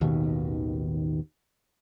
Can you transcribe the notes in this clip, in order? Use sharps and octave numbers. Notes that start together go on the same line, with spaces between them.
A1 D#2 B2 D#3